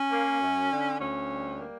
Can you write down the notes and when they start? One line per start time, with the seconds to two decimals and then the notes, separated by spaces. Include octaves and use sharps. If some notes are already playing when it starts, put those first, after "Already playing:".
Already playing: C#4
0.11 A#3
0.41 F#2
0.70 D3
0.99 D2 C#4
1.29 G3
1.59 A#3